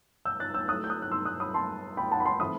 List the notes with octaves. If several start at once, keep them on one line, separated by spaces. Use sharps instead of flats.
E6 G6
F#6 A6
E6 G6
F#3 A3 E4 D#6 F#6
G6
D#6 F#6
F#6
C6 E6
D#6 F#6
B5 D#6
A5 C6
G5 B5
F#5 A5
B5
A5 C6
E3 A3 C4 E4 B5 D#6